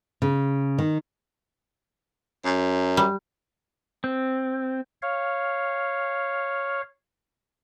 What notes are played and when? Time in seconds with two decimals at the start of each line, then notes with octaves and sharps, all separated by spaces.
0.22 C#3
0.79 D#3
2.46 F#2
2.97 G3
4.04 C4
5.02 C#5 F5